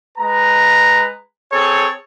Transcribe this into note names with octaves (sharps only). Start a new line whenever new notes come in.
G#3 B4 A#5
C4 G#4 A4 C#5